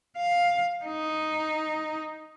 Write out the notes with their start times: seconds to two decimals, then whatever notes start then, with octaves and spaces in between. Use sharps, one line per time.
0.17 F5
0.85 D#4